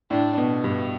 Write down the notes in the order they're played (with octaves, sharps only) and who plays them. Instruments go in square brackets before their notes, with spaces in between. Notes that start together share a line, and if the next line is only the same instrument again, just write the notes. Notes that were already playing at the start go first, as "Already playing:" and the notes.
[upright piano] A2 [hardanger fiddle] D4
[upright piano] B2
G2